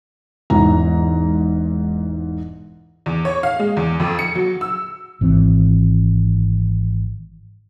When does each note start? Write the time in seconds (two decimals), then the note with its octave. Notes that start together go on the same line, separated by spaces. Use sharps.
0.50 E1 G#2 E3 A#5
3.06 E2
3.25 C#5
3.43 F5
3.59 G#3
3.77 E2
4.00 F2
4.19 C#7
4.35 F#3
4.61 E6
5.21 G#1 E3 C4